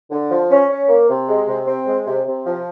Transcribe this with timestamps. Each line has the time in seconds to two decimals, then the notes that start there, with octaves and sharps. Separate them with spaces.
0.11 D3
0.31 F3
0.50 C#4
0.70 C#4
0.89 A#3
1.09 C3
1.28 G#3
1.47 C3
1.66 C4
1.86 G#3
2.06 C3
2.25 C3
2.45 F3